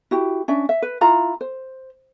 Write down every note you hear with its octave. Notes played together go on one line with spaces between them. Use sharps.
E4 F#4 G4
C#4 D4 E5
E5
B4
E4 F4 A#5
C5